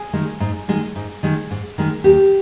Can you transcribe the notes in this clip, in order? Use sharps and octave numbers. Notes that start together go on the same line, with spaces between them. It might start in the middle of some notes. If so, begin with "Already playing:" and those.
Already playing: G#4
D#3 G#3
G#2
D#3 G#3
G#2
D#3 G#3
G#2
D#3 G#3
D#2 G4